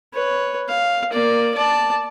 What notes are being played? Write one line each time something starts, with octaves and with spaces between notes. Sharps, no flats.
B4 C#5
F5
A#3 D5
D5 A5